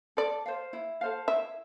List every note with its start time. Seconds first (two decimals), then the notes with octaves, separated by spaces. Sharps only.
0.17 A4 D5
0.46 C5 F5
0.73 E4
1.01 A4 C5 F5
1.28 E4 E5